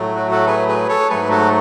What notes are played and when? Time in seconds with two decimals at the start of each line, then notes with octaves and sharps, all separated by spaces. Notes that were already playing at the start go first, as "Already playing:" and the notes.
Already playing: A2 F#3 A3
0.15 F#4
0.31 F#4 A4
0.47 G#4 B4
0.68 G#4 B4
0.88 A4 C#5
1.10 G#2 F#3 A3 G#4 B4
1.30 F#4 A4